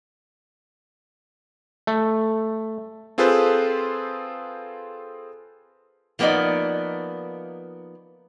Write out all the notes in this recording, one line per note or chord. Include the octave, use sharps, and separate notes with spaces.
A3
C4 F4 G#4 A4 B4 C5
F3 A#3 B3 C#4 D#4 D5